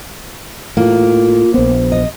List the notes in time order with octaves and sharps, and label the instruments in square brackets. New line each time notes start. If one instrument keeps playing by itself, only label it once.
[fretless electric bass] A2 [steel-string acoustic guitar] A#3 [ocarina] F4
[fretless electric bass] A#1 B3 [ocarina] C5
[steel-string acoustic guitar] D#5